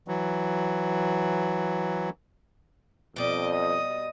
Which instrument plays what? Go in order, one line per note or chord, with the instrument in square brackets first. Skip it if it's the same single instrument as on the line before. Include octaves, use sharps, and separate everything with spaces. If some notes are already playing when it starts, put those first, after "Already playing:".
[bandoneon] E3 F#3
[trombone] F2 [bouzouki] B2 G3 [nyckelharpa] D#5 D6
[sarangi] D#5 [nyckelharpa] D#6